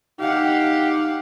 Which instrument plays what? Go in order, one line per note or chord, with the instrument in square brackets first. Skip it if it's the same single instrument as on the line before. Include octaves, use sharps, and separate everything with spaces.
[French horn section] D#4 [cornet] G4 [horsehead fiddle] F5 F#5